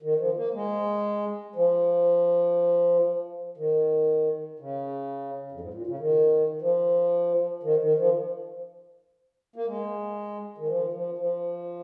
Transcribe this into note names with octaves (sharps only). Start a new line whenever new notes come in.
D#3
F3
A#3
G#3
F3
D#3
C#3
F2
G#2
A#2
C#3
D#3
F3
D#3
D#3
F3
A#3
G#3
D#3
F3
F3
F3